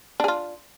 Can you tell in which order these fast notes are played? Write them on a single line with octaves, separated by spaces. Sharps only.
D4 G#4 F4